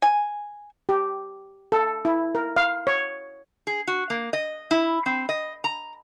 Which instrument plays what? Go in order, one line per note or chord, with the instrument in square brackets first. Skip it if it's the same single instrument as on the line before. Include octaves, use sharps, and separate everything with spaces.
[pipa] G#5
[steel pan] G4
A4
E4
A#4
F5
C#5
[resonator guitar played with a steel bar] G#4
F#4
A#3
D#5
E4
C4
D#5
A#5